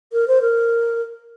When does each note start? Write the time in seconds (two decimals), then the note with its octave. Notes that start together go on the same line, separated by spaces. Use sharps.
0.12 A#4
0.28 C5
0.41 A#4